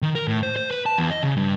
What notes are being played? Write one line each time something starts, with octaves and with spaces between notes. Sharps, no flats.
D#3
A#4
A2
C5
C5
B4
A5
E2
D#5
C#3
G2